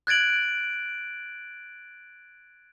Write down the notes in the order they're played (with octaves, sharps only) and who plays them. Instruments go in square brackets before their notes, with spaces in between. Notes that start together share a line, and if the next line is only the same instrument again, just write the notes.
[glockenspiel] F#6 G#6 A6 D7 F#7